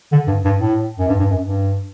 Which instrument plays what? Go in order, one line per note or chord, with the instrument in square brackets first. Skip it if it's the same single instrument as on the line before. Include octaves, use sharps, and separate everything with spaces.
[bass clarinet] D3
G2
G2
A2
F#2
G2
G2
F#2
G2